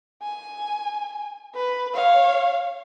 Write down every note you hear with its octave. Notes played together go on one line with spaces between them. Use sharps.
G#5
B4
C#5 F5